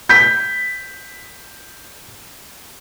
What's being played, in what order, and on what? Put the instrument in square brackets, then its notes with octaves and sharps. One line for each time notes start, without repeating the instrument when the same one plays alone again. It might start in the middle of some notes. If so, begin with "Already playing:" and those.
[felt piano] G6 B6